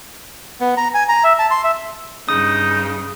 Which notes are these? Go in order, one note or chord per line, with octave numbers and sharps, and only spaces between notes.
B3
A#5
G#5
A#5
E5
A5
C6
E5
G2 C#3 D#4 D#6